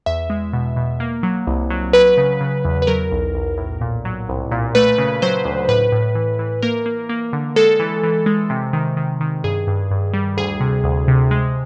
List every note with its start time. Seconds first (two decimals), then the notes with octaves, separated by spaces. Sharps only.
0.06 E2 E5
0.30 G#3
0.53 B2
0.76 B2
1.00 A#3
1.23 F#3
1.47 C2
1.70 F#3
1.93 F#3 B4
2.17 C#3
2.41 C#3
2.65 E2
2.82 B4
2.87 F#3 A#4
3.11 B1
3.34 B1
3.57 A2
3.81 A#2
4.05 F#3
4.28 C2
4.51 A#2
4.75 A3 B4
4.98 C#3
5.22 F#3 C5
5.45 D2
5.69 A2 B4
5.92 A2
6.15 E3
6.39 E3
6.62 A#3 A#4
6.86 A#3
7.09 A#3
7.33 D3
7.56 G#3 A4
7.80 E3
8.03 E3
8.26 G#3
8.50 C3
8.73 D#3
8.97 D#3
9.21 D#3
9.44 G2 G#4
9.67 G2
9.91 G2
10.13 G3
10.37 D2 G#4
10.60 C3
10.84 D2
11.08 C3
11.31 G#3